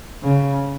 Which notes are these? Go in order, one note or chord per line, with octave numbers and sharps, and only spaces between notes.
C#3